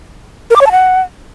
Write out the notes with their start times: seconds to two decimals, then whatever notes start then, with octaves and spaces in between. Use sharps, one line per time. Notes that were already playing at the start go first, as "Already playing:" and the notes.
0.50 A#4
0.56 D6
0.61 C#5
0.66 A5
0.72 F#5